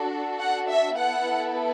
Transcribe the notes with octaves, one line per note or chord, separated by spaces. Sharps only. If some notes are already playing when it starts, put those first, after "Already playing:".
Already playing: D4 F#4 A4
F#5
E5
B3 E4 A4 F#5